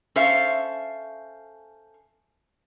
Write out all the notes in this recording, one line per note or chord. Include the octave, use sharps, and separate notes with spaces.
C#4 A4 C5 E5 F5